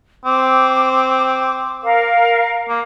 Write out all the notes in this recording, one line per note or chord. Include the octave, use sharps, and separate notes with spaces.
C4 D6
A#4 F5
A#3